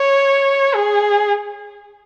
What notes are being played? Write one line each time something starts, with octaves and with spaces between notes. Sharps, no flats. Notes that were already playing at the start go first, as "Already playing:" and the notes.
Already playing: C#5
G#4